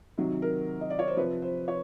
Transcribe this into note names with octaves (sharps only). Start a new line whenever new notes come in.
C3 D#3 F#3
A#4
D#5
D5
C#5
C5
C3 F3 B4
C5
C#5